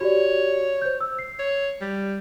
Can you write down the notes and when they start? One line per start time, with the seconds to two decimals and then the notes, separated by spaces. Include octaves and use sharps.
0.01 F#4 G4 C#5 D5
0.82 C5 G6
1.01 E6
1.19 C7
1.39 C#5
1.81 G3